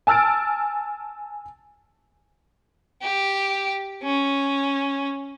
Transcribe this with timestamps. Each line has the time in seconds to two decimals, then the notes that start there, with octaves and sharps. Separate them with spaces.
0.07 G#5 A5 E6 F6 A6 D7
3.02 G4
4.03 C#4